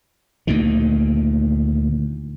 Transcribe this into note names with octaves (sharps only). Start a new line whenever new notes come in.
D2 A#2 D#3